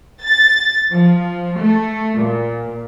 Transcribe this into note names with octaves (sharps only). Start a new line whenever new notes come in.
A6
F3
A3
A#2